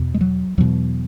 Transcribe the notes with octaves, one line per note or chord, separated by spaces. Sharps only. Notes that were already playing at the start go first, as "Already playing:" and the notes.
Already playing: E2 B2
G#3
F#3
E2 B2 F#3